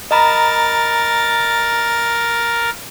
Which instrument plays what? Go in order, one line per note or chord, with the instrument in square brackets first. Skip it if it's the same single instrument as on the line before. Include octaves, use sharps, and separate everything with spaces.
[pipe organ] A#4 A6 [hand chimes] D#5 A#5 B5